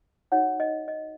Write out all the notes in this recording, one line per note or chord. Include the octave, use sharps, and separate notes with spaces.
D#4 F#4 C#5 F#5
D#5
D#5